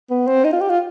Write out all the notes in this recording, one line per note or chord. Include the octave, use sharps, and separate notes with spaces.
B3
C4
D#4
F4
G4
F4